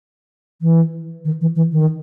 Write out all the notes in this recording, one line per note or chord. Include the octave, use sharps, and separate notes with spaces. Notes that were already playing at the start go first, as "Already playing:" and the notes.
E3
D#3
E3
E3
D#3